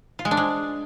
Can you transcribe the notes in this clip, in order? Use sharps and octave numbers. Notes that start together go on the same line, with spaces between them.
F4
G#3
D4
G#3